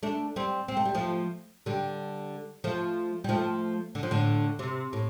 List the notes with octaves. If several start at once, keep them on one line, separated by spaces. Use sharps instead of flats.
A3 D4
G3 C4
C4
A3
G3
F3 A3
D3 G3
F3 A3
G3
F3 A3
D3
F3
A2 D3
C3
A2